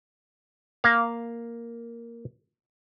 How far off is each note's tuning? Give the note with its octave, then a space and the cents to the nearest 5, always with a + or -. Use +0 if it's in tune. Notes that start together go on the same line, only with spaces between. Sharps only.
A#3 +0 F5 +0